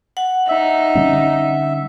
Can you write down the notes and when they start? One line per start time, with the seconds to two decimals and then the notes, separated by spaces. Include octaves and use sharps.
0.17 F#5
0.48 D#4 E5
0.95 D3 G3 C#4